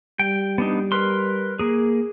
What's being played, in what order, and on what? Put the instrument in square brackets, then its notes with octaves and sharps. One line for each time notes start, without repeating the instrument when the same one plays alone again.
[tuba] G3 [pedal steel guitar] G5
[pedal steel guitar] B3 D4 D#4
A#4 B4 C6
A#3 G#4